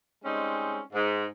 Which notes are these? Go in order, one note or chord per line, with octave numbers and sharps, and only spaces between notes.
G3 G#3 C4 C#4 D#4
G#2